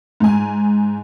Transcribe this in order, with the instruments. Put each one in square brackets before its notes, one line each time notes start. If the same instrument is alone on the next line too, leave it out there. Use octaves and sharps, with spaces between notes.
[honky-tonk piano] G#2 G#5